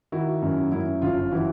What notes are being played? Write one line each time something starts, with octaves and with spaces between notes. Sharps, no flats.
D#3 E4 F#4
F#2
F#2 E4
G1 F4
E3 E4 F#4